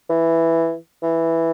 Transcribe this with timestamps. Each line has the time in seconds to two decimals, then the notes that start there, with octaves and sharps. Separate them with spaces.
0.10 E3
1.03 E3